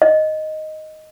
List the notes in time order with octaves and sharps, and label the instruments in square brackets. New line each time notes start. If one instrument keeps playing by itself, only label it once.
[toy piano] D#5